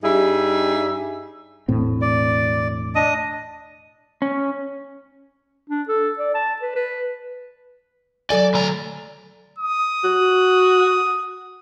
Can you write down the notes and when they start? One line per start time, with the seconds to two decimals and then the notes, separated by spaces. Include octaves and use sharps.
0.03 G2 G3 D#4 G#4 E5
1.68 E1 A2 C4
2.01 D5
2.95 D4 D#5 D#6
4.22 C#4
5.69 D4
5.88 A4
6.19 D5
6.34 A5
6.62 B4
6.76 B4
8.30 F#3 A4 D5 G#5
8.54 D2 A#5
9.59 D#6
10.04 F#4